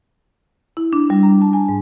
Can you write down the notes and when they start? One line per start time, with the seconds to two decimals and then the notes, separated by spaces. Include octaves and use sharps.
0.77 E4
0.93 D4
1.10 G3
1.23 A#5
1.42 A5
1.53 G#5
1.69 G#2